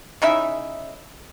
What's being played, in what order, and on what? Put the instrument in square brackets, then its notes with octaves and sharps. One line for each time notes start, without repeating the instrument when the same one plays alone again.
[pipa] C#3 D#4 E4 E5